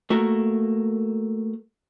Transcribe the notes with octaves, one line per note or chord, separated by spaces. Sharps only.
A3 A#3 F#4 A#4